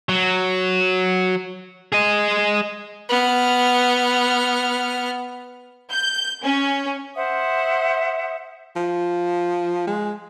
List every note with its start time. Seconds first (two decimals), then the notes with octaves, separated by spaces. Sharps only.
0.09 F#3
1.92 G#4 D#5
3.09 B3 F6
5.91 G6
6.43 C#4
7.15 C5 E5 F#5 D#6
8.76 F3
9.87 G#3